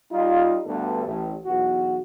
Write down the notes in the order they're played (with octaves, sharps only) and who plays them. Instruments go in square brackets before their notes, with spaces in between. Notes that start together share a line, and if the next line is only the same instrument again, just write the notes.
[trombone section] G3 D#4 F4
D2 G2 D3 B3 A4
A1
B1 E2 F#4